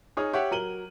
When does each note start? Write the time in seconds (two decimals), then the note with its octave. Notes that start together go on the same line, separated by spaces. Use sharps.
0.17 D#4 G#4 C#5 D#6 F6
0.33 G4 C#5 E5 F#5
0.51 F#3 A#4 D#7 F#7 G7